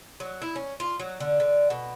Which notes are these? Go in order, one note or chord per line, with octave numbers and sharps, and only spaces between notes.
F#3
E4
C#4
F4
F#3
D3
D3
B2